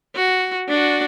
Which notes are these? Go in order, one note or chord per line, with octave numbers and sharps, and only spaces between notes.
F#4
D4 F#4